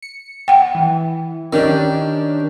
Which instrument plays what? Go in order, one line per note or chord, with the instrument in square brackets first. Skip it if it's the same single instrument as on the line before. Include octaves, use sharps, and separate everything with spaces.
[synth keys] C#7
[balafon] F#5 G5
[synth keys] E3
[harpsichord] D#3 [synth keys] C#4 D4 G4